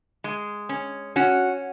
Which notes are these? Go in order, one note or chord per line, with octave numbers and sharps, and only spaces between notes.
G#3
C#4
C#4 F#4